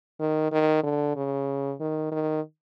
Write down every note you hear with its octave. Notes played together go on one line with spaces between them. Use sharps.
D#3
D#3
D3
C#3
D#3
D#3